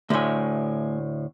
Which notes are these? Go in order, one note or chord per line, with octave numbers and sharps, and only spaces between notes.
D2 A2 A3 G#5